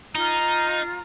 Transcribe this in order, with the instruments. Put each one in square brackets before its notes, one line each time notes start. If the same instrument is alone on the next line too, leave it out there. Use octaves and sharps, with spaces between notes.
[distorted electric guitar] D#4 [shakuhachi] F4 [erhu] A#5